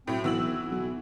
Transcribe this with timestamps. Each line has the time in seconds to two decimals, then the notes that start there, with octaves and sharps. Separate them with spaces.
0.07 A2 F#3 C4
0.24 B1 E3 F#4 E6 F#7
0.71 B1